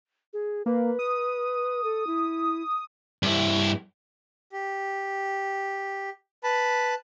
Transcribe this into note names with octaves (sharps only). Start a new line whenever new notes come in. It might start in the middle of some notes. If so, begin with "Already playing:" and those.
G#4
A#3 B4
D#6
A4
E4
G2 E4
G4
B4 A5 B5